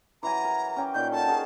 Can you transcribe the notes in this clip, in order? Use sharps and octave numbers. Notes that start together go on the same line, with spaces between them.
E3 F#3 G#5 A#5
A#4
C#4 G5 D6
A#2 D#3 G6
F#4 A4 A5
F#4 G#4 A#4